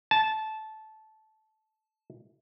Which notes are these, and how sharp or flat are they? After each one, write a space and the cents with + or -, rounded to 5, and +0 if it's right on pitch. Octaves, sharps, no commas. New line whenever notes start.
A5 -15